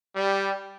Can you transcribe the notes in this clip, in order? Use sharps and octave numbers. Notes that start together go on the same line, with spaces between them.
G3